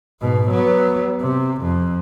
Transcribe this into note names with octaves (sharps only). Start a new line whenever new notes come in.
G#2 B2
F#3 B3
C3
F2